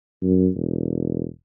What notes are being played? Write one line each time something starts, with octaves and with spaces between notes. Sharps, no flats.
F#2
E1